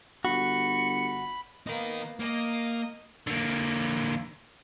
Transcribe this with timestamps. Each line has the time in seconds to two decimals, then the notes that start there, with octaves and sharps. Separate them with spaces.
0.25 G1 F#4 B5 C#7
1.67 A#3 B3 D#4 A#4
2.20 A#3 D#5
3.27 D3 A#3